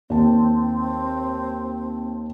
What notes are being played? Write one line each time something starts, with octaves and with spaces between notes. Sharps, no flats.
D#2 C4 A5